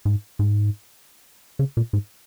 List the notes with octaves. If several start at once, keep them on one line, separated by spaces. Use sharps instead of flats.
G#2
G#2
C#3
A#2
G#2